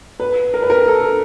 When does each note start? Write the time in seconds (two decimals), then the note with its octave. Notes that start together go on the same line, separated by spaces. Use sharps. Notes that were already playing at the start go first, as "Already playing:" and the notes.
0.20 B4
0.54 A#4
0.62 B4
0.70 A#4
0.88 A4